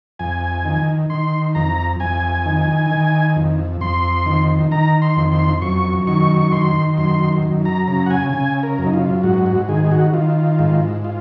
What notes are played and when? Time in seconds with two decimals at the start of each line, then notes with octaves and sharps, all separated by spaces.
0.19 F2 G#5
0.65 D#3
1.10 D#3 C6
1.55 F2 A#5
2.00 F2 G#5
2.46 D#3
2.91 D#3
3.36 F2
3.81 F2 C6
4.26 D#3
4.71 D#3 A#5
5.02 C6
5.17 F2
5.32 C6
5.62 F#2 C#6
6.07 D#3 C#6
6.41 C#6
6.52 D#3 C6
6.97 F#2 C6
7.43 F#2
7.65 A#5
7.88 C#3 A#5
8.06 F#5
8.10 G#5
8.33 C#3 G#5
8.63 A#4
8.78 F#2
8.86 D#4
8.93 F4
9.23 G#2 F#4
9.46 F#4
9.68 D#3 G#4
9.84 G#4
9.91 F#4
10.13 D#3 F4
10.59 G#2
11.04 F4